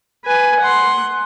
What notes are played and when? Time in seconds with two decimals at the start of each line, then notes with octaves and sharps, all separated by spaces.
0.25 B4 G#5
0.61 F#5 C6